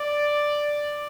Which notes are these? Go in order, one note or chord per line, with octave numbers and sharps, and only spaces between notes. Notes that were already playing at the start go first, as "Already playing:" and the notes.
Already playing: D5